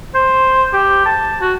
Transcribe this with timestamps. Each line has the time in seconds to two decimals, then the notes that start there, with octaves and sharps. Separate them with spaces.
0.14 C5
0.73 G4
1.05 A5
1.41 F#4